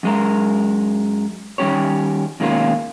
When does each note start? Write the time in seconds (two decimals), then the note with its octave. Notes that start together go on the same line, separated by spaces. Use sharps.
0.03 F#2 G#3 A#4
1.58 D#3 G3 C#4 G4 C#5
2.40 B2 D#3 G#3 A#3 C#4 F4